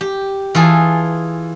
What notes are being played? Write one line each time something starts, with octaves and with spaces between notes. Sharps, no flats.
G4
E3 F4 G#4 A5